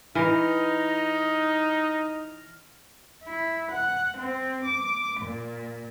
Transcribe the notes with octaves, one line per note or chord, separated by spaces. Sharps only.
E3 D#4 F6 A#6 F7
E4
F#5
C4
D6
A#2